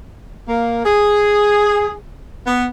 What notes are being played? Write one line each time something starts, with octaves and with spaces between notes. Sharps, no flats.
A#3
G#4
B3